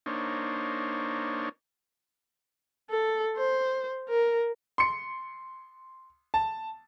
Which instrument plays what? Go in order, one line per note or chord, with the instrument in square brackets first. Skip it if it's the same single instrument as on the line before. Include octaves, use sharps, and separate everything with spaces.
[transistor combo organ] A#3 D4 D#4 C5 C#5
[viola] A4
C5
A#4
[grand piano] C6 C#7
A5